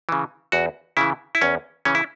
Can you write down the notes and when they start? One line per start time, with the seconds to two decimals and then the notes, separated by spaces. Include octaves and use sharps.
0.09 C#3 E3
0.52 E2 F#4
0.97 C#3 E3 E4
1.35 E4
1.41 E2 C#4
1.85 C#3 E3 C#4
1.95 E4